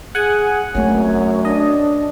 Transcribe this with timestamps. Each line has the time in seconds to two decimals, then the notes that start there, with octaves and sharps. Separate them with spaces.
0.15 G#4 F#5 G#5
0.75 F#2 A3 C4 C#5
1.45 D4 D#5